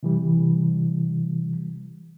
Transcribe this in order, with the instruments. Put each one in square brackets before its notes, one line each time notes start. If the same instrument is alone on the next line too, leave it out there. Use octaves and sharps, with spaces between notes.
[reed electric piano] C3 E3 G3